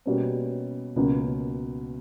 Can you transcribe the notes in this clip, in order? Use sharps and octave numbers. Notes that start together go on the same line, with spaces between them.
B2 G3 A#3 C#4
C#2 B2 F#3 A#3